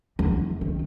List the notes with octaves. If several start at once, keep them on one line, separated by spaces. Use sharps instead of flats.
E2
D#3